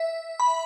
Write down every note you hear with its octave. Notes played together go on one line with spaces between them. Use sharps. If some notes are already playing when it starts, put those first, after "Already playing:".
Already playing: E5
B5